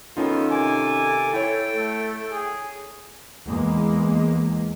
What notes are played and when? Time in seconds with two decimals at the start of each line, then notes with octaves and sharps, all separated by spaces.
0.17 D#3 B3 C#4 D#4 F4 A4
0.51 C3 D#3 G#5 D6
1.33 E4 C#5 G5
1.75 A3
2.31 G#4
3.47 E2 G#3 A#3